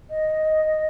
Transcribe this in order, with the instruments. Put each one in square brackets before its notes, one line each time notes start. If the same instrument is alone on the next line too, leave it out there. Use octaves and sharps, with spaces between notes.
[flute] D#5